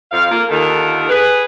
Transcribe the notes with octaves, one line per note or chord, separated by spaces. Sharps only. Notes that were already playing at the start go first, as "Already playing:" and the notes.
F2 F5
A#3 F4
D#2 D3 D#3 F4 A4 A#4
G#4 B4